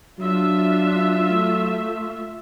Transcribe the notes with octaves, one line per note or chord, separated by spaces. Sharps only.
F#3 D4 F4 E5
A3